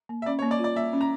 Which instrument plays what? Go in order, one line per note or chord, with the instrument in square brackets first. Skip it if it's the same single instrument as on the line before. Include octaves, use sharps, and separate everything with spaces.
[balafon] A#3
[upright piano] E5
[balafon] C#4 [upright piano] D5
[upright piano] C#5
[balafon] A#3
[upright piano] D5
[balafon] F4
[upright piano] D5
[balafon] A#3 [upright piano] E5
[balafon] C#4
[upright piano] A#5